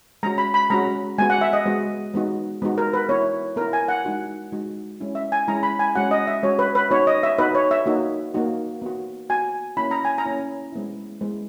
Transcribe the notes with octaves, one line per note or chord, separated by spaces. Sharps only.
G#3 C#4 F#4 A#5
B5
B5
G#3 C#4 F#4 A#5
G#3 B3 F#4 G#5
F#5
E5
D#5
G#3 B3 F#4
G#3 B3 D#4 F#4
G#3 B3 D#4 F#4
A#4
B4
B3 E4 C#5
B3 E4 A#4
G#5
F#5
G#3 D#4 F#4
G#3 D#4 F#4
G#3 C#4 E4
E5
G#5
G#3 C#4 E4 A#5
B5
G#5
G#3 C#4 F#4 F#5
D#5
E5
G#3 C#4 F#4 C#5
B4
B4
B3 D#4 F#4 C#5
D#5
E5
B3 D#4 F#4 B4
C#5
E5
A#3 D#4 F#4
A#3 D#4 F#4
B3 F#4
B3 F#4 G#5
A#3 C#4 E4 B5
A#5
G#5
A#5
A#3 C#4 E4
G#3 B3 E4
G#3 B3 E4